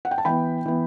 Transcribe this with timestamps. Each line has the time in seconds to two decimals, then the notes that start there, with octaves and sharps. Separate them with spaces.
0.05 F#5
0.11 G5
0.18 A5
0.25 E3 B3 G5 B5
0.66 E3 B3